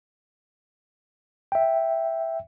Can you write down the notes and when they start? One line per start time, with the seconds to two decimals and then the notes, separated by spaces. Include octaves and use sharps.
1.52 E5 G5